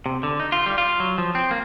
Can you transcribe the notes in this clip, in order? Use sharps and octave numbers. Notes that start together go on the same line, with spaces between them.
C3
D3
D#4
F4
G3
F4
F#3
F3
C4
A#3